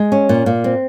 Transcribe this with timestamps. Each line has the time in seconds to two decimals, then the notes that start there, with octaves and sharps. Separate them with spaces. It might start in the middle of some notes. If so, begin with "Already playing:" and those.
Already playing: G#3
0.12 C#4
0.29 A#2
0.46 A#2
0.64 C4